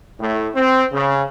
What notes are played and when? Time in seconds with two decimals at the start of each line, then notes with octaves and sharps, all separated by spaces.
0.20 A2
0.55 C4
0.93 C#3